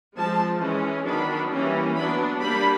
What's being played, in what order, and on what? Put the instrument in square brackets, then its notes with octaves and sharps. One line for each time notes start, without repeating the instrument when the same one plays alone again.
[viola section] F3 G#3 C4 A5
E3 G#3 C#4
D#3 F#3 B3 D4 B5
E3 G3 A#3 C#4
F#3 B3 D4 B5
G3 A#3 D4 B5